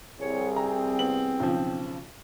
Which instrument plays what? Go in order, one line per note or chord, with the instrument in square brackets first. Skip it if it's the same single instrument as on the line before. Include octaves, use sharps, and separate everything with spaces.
[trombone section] C2 G#4 [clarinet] C#5
[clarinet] C4 [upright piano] A#5
[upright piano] B3 F#7
B1 C#3 F3